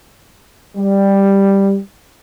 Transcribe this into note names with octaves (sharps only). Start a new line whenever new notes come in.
G3